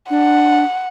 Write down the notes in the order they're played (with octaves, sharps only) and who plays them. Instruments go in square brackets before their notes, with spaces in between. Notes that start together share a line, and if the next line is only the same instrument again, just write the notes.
[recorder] D4 [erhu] F#5